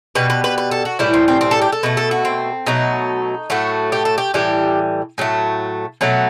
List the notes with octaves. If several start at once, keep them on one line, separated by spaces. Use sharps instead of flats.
B2 G3 B4
B4
B4
B4
A4
F#4
A2 E3 G3 E4
C4
C4
C4
A4
G4
A4
B2 A3 B4
A4
F#4
C4
B2 F#3 A3 D#4
A2 F#3 A3 F#4
G4
A4
G4
A2 E3 G3 G4
A2 F#3 A3
B2 F#3 A3